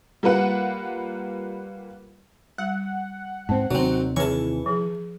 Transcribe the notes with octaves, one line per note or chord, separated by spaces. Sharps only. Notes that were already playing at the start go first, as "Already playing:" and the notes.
G3 A#3 F4 B4 F#5
G3 F#5
G#2 C4 A5
D#2 C3 D#3 F#3 C4
E3 G#4 B4 C#5 A5 C#6
F3 G#4